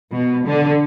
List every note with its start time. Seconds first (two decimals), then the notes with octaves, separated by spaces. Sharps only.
0.13 B2
0.45 D3